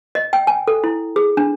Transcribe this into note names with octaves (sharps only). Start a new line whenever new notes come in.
D#5
G5
G#5
A4
E4
G#4
D4